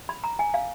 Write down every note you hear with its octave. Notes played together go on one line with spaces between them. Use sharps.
B5
A#5
G#5
F5